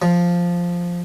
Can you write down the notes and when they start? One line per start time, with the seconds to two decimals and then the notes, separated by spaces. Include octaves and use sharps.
0.02 F3